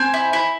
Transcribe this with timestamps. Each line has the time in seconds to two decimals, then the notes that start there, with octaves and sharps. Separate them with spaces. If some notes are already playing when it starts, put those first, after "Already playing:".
Already playing: C4 G#5
0.14 E4
0.33 E4